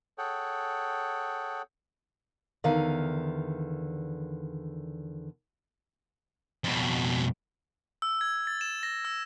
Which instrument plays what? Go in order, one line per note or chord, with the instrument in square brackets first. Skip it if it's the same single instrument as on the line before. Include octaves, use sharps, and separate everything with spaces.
[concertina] G#4 A4 C#5 F#5 G5
[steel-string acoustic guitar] E2 D3 D#3 F5
[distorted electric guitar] F2 B2
[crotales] E6
G#6
A6
E7
A#6
E6